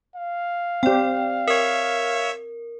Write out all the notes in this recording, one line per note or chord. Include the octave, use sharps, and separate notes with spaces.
F5
C4 G4 D5 G5
A#4 C#5 E5